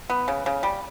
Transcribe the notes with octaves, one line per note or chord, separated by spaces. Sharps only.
B3
C#3
C#3
G3